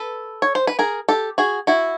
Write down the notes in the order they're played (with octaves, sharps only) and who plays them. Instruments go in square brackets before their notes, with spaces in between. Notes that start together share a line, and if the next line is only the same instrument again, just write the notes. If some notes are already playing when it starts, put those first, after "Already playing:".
Already playing: [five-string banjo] A4 B4
C#5
C5
B4
G#4 A#4
G4 A4
F#4 G#4
E4 F#4